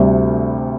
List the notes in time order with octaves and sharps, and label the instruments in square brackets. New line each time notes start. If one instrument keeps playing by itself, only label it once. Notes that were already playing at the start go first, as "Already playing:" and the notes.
Already playing: [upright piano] D2 C3 G3